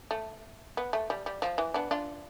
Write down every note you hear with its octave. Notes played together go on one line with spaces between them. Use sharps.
A3
B3
A3
G3
G3
F3
E3
B3 D4
D4 F4